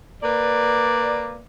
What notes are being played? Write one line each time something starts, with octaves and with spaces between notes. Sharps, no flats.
A#3 B4 D5